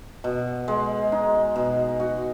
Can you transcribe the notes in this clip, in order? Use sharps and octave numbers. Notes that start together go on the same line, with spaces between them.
B2
G#3
D#4
B2
F#4